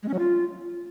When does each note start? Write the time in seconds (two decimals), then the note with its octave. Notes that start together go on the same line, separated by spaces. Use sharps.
0.03 G#3
0.08 C#4
0.14 F#3
0.19 F4